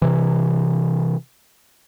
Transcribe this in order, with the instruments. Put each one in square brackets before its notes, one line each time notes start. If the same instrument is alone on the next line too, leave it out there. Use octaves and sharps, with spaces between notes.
[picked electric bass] C3 E3